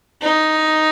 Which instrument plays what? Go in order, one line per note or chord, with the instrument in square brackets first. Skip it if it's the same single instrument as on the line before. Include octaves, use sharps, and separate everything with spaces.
[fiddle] D#4